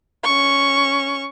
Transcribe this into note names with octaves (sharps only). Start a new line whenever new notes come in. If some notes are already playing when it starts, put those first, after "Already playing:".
C#4 C#6